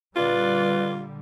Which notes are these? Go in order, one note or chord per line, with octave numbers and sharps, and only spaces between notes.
A#2 D3 G3 F4 B4 D5